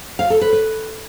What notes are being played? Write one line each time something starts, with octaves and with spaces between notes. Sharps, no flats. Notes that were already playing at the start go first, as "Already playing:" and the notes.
F5
A4
B4
B4